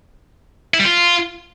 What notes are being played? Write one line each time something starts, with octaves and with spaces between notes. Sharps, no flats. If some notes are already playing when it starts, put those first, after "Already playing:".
E4
G3
F4